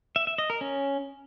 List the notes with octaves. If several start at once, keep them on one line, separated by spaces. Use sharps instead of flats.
E5
E5
D#5
A#4
C#4